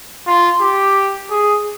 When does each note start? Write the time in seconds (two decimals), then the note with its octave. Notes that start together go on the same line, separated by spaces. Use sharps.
0.27 F4
0.61 G4
1.30 G#4